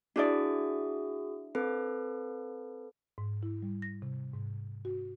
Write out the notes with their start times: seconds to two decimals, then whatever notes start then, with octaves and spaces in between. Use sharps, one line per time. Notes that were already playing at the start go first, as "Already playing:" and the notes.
0.16 D4 E4 F#4 G#4 D5 D#6
1.55 C4 A4 B4
3.18 G#2
3.43 E4
3.62 G3
3.82 A#6
4.02 C3
4.34 G#2
4.85 F#4